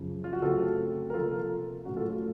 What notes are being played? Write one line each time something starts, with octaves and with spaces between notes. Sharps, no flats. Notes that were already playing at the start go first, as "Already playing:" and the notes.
Already playing: F#2 C#3 F3
F4
F#4
C#3 F#3 A3 C4 F4 A4
A#4
C3 F3 A#3 F4 A4
A2 F#3 A3 C#4 F#4
F4 A4
F4